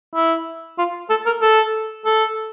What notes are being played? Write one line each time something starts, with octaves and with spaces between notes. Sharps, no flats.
E4
F4
A4
A#4
A4
A4